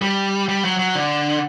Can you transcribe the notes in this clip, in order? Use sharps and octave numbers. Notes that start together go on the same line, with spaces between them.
G3
G3
F#3
F#3
D3